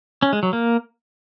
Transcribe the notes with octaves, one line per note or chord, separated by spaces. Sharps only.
C#4
G#3
F#3
A#3